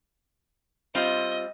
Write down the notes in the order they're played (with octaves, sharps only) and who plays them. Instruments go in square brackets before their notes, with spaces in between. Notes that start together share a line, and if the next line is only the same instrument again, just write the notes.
[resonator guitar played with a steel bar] G3 C4 F4 [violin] D#5